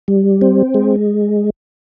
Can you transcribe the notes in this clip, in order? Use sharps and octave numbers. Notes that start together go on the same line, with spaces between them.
G3
C4
G#3